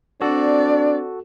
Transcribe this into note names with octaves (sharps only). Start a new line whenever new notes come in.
C4 D4 F#4 A4 D5